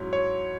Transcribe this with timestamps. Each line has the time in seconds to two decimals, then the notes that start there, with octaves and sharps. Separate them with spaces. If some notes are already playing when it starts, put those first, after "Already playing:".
Already playing: G#2 F#3 C#4 E4
0.13 C#5